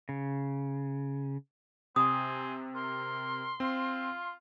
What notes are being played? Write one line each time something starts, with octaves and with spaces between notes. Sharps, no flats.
C#3
C3 C4 G#5 D#6
A#4 C6
C4 F4